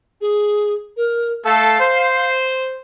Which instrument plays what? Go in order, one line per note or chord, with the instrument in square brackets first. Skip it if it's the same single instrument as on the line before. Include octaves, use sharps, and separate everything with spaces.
[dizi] G#4
A#4
[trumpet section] A3 A4 [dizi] F5
[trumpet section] C5